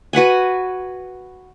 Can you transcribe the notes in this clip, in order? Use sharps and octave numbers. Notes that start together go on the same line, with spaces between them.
F#4 B4 F#5 G#5